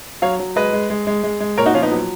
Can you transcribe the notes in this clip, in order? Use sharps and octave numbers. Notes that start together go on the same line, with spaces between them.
F#3 C#5 F5
F#3
G#3 B4 D#5
G#3
G#3
G#3
G#3
G#3
A#2 A#4 C#5
D#4 F#4
F3 C#4 F4
B3 D#4
F#3